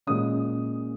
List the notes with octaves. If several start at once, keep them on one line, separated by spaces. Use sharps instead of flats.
A#2 G#3 C#4 D#6